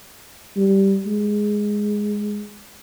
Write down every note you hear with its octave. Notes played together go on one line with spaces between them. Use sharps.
G3
G#3